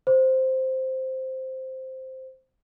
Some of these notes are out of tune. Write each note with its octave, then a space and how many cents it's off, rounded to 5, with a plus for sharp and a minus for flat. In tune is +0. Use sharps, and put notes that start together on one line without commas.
C5 +0